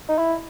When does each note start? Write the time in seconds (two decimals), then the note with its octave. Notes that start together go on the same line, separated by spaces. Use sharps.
0.09 D#4
0.18 E4